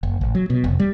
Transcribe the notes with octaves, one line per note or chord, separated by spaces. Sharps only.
F#1
A1
F#3
B2
F1
G3